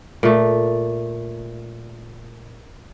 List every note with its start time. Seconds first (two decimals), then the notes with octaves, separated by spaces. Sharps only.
0.23 A#2 A3